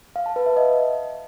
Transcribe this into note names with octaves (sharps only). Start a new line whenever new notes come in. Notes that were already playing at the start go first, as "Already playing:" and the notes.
F5
A5
B4
E5
D#5